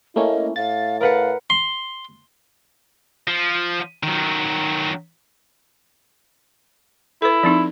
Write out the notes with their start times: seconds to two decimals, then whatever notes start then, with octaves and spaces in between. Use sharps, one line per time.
0.16 A3 A#3 C#4 E4 D#5
0.56 A2 F5 A6
1.01 A#4 B4 F5 F#5
1.50 C6
3.27 F3
4.03 D#3 F#3
7.22 E4 A4 B4
7.43 F3 C4 D#4